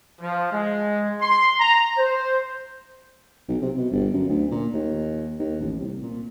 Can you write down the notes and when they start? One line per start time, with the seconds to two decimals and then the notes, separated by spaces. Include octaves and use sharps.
0.21 F3
0.53 G#3
1.21 C6
1.60 A#5
1.98 C5
3.48 B1
3.62 C3
3.77 B2
3.92 G1
4.13 F#2
4.29 D2
4.51 A#2
4.73 D#2
5.39 D#2
5.61 A1
5.80 C2
6.02 A#2